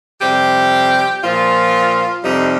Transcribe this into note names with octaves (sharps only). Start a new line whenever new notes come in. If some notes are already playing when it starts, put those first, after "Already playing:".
F2 C3 G3 G4
A#2 F3 F4
F2 C3 G3 D#4